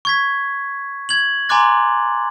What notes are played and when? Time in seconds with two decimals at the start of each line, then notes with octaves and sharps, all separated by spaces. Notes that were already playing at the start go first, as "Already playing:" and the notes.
0.05 C#6 G#6 B6
1.09 G#6 F#7
1.49 G#5 A#5 C6 D6 F#6 A6